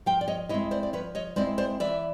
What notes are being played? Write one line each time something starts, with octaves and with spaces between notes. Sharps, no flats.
F3 F5 G5
D5
C#5 D#5
G#3 C4 E4 C#5 D#5
C5 D5
D5
F3 B4 C#5
C#5 D#5
G#3 C4 E4 C5 D5
C5 D5
E3 D5 E5